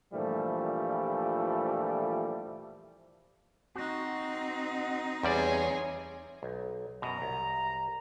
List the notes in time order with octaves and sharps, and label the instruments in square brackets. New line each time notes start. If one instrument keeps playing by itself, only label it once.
[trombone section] G2 A#2 E3 F3 G3 A3
[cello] C4 D#4 [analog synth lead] F#4
[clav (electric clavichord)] E2 G3 D5 [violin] G#4 C#5 [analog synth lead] C6
[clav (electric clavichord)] B1
[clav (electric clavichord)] F#2 B2 [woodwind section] A#5
[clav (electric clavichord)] C2